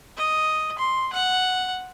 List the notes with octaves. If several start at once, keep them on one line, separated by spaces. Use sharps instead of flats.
D#5
C6
F#5